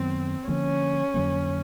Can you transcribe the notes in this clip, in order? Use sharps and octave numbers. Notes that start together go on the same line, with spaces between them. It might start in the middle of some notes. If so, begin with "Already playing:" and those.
Already playing: F#2 D#3 F#3 B3 C4
D3 F3 A#3 C#4
F2 D3 F#3 A#3